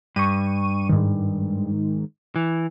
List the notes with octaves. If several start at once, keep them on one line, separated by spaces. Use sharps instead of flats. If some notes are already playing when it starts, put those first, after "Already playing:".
G2 C#6 D#7
G#2 D#3
E3